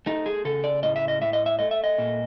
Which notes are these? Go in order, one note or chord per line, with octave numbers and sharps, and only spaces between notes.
A3 D#4
G#4
C#3 A4
D5
A2 D#5
E5
D#5
A2 E5
D#5
E5
A3 D#5
E5
D#5
A#2